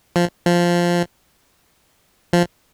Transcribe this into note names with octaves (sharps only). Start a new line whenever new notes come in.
F3
F3
F3